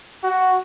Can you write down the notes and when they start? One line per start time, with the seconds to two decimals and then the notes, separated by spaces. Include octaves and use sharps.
0.24 F#4